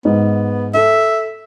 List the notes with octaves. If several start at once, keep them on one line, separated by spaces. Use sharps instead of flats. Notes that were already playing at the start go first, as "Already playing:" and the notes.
G#2 B3
A4 E5